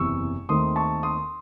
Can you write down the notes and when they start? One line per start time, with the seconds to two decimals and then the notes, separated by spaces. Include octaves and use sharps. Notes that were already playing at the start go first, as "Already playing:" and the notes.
Already playing: F#1 E2 C3 E3 C#6 E6
0.49 D#2 D#3 A3 C4 C6 D#6
0.76 A5 C#6
1.03 C6 D#6